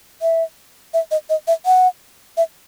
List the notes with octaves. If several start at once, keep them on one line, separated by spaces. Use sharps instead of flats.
E5
E5
D#5
D#5
E5
F#5
E5